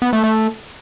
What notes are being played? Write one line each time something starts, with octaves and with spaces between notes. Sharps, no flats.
B3
A3
A3